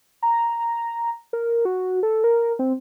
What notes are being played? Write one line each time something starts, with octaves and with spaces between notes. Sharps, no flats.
A#5
A#4
F#4
A4
A#4
C4